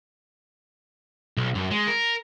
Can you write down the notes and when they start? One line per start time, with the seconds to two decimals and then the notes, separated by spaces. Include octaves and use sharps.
1.37 B1
1.55 F#2
1.71 G#3
1.87 A#4